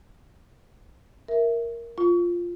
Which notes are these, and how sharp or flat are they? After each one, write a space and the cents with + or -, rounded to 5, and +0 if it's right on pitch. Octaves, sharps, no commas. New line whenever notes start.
A#4 +0 E5 +0
F4 +0 C#6 +35